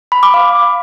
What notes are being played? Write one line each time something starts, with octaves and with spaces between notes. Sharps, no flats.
B5
D6
F5